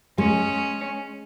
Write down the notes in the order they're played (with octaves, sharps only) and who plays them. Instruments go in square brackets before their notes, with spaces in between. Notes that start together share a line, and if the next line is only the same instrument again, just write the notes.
[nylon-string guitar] G#3 [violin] C#4